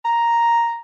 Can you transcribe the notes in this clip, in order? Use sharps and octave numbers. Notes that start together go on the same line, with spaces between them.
A#5